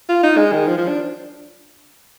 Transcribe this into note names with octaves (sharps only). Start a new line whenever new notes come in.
F4
D#4
G#3
D#3
F3
F3
D4